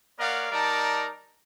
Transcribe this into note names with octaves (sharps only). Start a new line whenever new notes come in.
A#3 A#4 C#5 D5 F5 F#5
G3 D#4 A#4 D5 A5 A#5